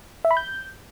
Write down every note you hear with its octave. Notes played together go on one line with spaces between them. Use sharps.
E5
B5
G6